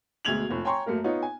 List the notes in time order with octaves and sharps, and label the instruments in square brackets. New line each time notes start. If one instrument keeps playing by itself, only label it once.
[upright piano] D2 B2 G#3 G#6 F7 F#7
F1 A#2
C#5 G5 G#5 A#5 C6 C#6
F#2 A3 A#3 A#4
B3 D#4 F4 C#5
G#5